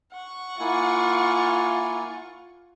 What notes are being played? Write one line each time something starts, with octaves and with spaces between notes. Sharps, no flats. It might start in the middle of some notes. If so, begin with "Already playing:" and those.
F#5 C#6
A#3 E4 F4 G#5